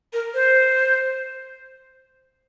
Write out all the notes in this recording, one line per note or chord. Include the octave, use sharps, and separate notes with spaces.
A#4
C5